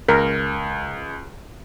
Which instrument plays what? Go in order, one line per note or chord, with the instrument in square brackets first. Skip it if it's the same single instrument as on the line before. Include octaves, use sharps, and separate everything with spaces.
[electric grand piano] C#2 [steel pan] A#4